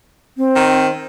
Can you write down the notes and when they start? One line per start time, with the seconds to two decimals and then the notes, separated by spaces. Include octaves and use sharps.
0.37 C4
0.56 D#3